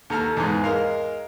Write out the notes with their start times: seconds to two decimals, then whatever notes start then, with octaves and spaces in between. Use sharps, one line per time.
0.10 D#2 A4 A#5 F6
0.37 E2 G#2
0.64 G#3 A#4 F5